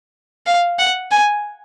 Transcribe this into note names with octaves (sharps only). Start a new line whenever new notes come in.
F5
F#5
G#5